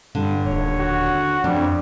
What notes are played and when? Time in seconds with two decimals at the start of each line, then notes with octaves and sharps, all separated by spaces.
0.15 G2 D3
0.46 D#1 C#5
0.79 F#4
1.44 F2 G3 D4